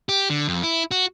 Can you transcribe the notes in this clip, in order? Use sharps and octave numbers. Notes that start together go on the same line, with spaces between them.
G4
D3
F2
E4
F#4